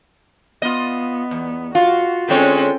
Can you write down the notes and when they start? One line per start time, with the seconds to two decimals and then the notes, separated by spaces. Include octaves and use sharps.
0.62 B3 F4 D#5
1.31 E2
1.75 F4 F#4
2.29 D3 G#3 C4 C#4 A4 C#5 G5